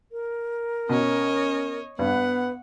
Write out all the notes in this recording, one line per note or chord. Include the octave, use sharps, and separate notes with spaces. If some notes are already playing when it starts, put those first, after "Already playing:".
A#4
B2 C#4 C#5 D#5
G2 B3 B4 F#5